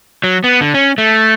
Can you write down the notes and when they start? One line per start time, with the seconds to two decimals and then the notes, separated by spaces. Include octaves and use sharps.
0.24 F#3
0.44 B3
0.61 D3
0.74 C#4
0.98 A3